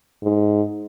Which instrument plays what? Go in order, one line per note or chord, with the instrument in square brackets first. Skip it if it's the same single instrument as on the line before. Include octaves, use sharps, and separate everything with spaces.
[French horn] G#2